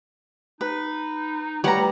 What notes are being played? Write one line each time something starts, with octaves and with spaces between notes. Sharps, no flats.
D#4 B4
G3 A3 B4 C#5 F#5 G5 A#5